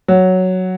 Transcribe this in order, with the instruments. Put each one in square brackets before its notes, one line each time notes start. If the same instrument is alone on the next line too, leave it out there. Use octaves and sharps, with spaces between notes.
[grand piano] F#3